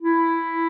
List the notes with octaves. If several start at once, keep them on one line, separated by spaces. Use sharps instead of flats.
E4